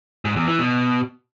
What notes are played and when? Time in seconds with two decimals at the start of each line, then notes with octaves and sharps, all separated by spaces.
0.25 G#2
0.36 E2
0.48 E3
0.59 B2